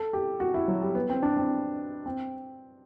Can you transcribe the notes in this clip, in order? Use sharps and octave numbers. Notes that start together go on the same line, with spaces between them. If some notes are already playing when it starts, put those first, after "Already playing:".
Already playing: A4
G4
F#4
E4
F#3
G3
B3
C4
D4
C4
C4